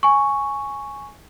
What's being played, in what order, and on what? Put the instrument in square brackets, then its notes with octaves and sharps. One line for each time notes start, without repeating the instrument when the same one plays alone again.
[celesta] G#5 C#6